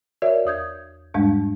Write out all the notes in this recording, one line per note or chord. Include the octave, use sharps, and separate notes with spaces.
F#4 A#4 C#5 D5 E5
E2 D#6 G6 G#6
E2 G#2 G3 G#3 D4